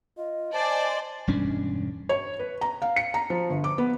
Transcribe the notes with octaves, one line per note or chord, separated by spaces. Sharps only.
F4 D#5
C5 D5 G#5 A5
E1 G2 C#4 D4
C#5
B4
A#5
F5
C#7
A#5
F3
G1
D6
B3